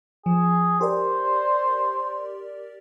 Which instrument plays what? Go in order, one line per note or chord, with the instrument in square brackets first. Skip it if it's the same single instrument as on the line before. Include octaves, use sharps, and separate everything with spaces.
[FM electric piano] F3 [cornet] G#4
[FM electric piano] G4 A#4 D5 [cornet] C5